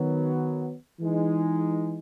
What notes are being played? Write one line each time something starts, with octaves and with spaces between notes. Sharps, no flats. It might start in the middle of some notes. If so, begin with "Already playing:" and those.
Already playing: D#3 F#3 B3
E3 G#3 D#4